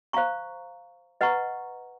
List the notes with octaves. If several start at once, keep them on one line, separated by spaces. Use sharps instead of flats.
C5 F5 A#5 C#6
B4 D#5 F#5 A#5 C#6